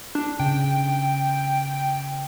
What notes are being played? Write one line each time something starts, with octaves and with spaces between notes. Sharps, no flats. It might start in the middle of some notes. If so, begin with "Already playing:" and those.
D4
C#3 G5